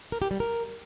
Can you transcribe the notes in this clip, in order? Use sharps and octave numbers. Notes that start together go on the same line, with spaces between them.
A#4
G4
G3
A#4